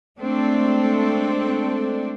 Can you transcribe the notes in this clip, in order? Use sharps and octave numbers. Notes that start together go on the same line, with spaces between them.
G#3 A3 C4 D4 A4